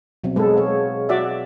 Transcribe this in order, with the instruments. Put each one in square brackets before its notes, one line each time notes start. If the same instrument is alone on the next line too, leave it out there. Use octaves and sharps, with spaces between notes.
[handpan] B2 F#3 C4
[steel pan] G#3 A4 [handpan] G#4 B4
[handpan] C#5 D#5 F5
[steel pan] F#4 D5 E5